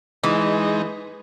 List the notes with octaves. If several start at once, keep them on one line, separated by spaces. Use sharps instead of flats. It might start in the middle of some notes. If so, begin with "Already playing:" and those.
E3 G#3 D#4